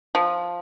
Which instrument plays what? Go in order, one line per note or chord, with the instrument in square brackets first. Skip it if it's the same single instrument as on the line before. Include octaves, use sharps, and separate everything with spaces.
[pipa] F3